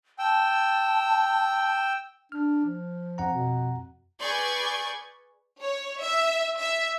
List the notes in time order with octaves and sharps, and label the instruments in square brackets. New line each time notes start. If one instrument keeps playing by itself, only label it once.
[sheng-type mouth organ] G5 E6 [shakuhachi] A5
[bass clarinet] D4 [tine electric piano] F6
[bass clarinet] F3
[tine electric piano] F2 F#5 A#5
[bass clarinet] B2
[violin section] G#4 B4 D5 C#6 G6 G#6
C#5
E5
E5